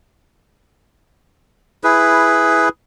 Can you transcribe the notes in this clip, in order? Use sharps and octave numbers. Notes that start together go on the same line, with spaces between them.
E4 G#4 B4